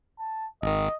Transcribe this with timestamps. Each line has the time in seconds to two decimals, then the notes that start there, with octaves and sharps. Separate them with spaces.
0.19 A5
0.62 G#1 D#3 D#5